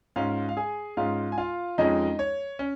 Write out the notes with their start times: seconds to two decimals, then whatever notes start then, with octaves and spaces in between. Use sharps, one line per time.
0.16 G#2 G#3 C#4 F4 F5
0.49 F5
0.57 G#4 G#5
0.97 G#2 G#3 C#4 F4 F5
1.32 G#5
1.38 F4 F5
1.78 F2 F3 G#3 C#4 D#4 D#5
2.19 C#5
2.59 C#4